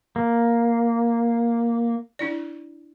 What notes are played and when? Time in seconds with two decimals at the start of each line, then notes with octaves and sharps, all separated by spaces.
0.16 A#3
2.19 D4 E4 D5